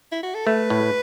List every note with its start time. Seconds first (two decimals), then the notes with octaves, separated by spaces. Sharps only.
0.12 E4
0.23 F#4
0.34 A4
0.46 A3 B4
0.70 A2